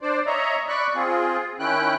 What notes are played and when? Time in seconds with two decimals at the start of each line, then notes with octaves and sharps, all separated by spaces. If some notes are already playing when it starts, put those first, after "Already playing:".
0.01 D4 C5 D5
0.27 C#5 D#5 E5 A#5
0.69 D5 B5 C#6 F#6
0.95 C4 F4 G#4
1.59 D#3 C#4 E4 G5 F#6